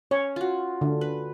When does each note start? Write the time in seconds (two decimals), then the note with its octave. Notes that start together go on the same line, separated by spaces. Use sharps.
0.11 C#4 C#5
0.36 F4 F#4
0.81 D3
1.01 B4